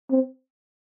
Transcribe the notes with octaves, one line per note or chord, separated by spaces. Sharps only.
C4